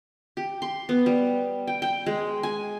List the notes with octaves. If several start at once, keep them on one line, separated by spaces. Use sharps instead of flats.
G4
C6
B3
G3
G5
G5
G#3
G#5